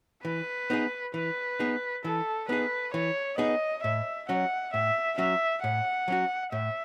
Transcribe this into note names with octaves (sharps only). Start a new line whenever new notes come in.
E3 B4
B3 D#4 G#4
E3 B4
B3 D#4 G#4
E3 A4
B3 D#4 G#4 B4
E3 C#5
B3 D#4 G#4 D#5
A2 E5
F#3 C#4 F#4 F#5
A2 E5
F#3 C#4 F#4 E5
A2 F#5
F#3 C#4 F#4
A2 E5